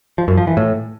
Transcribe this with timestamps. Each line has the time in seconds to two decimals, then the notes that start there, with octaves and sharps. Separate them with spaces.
0.18 F3
0.28 F#2
0.38 F3
0.47 E3
0.57 A2